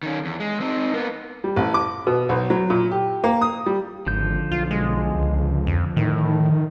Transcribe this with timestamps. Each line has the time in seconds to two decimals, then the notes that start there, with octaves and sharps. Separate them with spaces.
0.03 D#3 C#4
0.25 E2
0.40 G#3
0.60 C4 D#4
0.93 A#3 B3
1.44 G3
1.56 A1
1.74 D6
2.07 B2
2.29 B1
2.50 F#3
2.70 A#2
2.91 G4
3.24 A#3
3.41 D#6
3.66 G3
4.06 G#1 D3 F3 G6
4.52 B1 F4
4.71 G#3
5.15 C#2
5.67 F2
5.96 A2 D#3